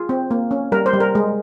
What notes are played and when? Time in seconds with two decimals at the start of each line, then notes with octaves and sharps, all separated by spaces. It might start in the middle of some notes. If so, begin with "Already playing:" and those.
Already playing: F4 G#4
0.09 C4
0.31 A#3
0.51 C#4
0.72 G3 A#4
0.86 C5
0.93 G3
1.00 A#4
1.15 G#3